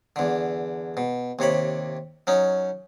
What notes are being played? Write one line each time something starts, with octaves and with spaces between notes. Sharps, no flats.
E2 D3
B2
D#2 C3 C#5 B5
F#3 C#4 D#4